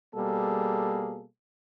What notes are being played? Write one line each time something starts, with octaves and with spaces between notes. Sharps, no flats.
B2 G3 A#3 G#4 A4